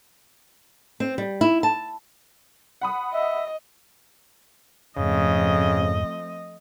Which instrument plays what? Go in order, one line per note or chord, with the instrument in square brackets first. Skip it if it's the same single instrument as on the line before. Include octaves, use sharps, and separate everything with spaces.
[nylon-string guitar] C4
G3
E4
A5
[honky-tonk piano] F#5 B5 D#6
[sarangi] D#5 [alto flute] E5
[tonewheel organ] F2 G#2 [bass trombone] C#3 [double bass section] F3 A3 C4 [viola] D#5